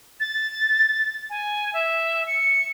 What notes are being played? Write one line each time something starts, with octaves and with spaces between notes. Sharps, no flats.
A6
G#5
E5
C#7